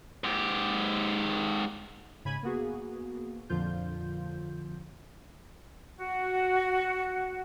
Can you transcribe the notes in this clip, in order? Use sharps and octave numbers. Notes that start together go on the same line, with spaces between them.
G#2 G4
G#2 C#3 B5 G#6 D#7
A#3 B3 F#4 G#4
F2 A#2 D3 F3 F4 G6
F#4